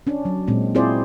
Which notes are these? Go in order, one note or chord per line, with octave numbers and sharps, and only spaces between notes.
C#4 D4
F#3
A#2 G#3 C4
C4 E4 F4 G#4 C5 D5